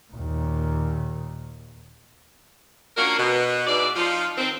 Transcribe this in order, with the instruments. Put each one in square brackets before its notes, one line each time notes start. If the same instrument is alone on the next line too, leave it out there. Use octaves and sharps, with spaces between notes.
[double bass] D#2 A#2
[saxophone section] F3 A#3 C#4 D4 F#4 A#4
B2
G#2 B2 E4 D5
F3 D#4 F4
D#3 C4